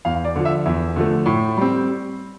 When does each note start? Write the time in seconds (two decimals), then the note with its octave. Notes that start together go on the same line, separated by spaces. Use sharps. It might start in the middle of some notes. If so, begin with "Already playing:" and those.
0.05 E2 F5
0.25 D5
0.36 D3 F3
0.45 E5
0.65 E2 E5
0.96 D3 F3 A3
1.26 A2
1.57 G3 C4